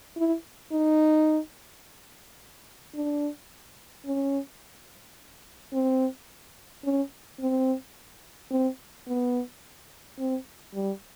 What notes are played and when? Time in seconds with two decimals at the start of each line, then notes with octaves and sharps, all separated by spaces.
0.16 E4
0.72 D#4
2.94 D4
4.05 C#4
5.72 C4
6.84 C#4
7.40 C4
8.51 C4
9.07 B3
10.19 C4
10.74 G3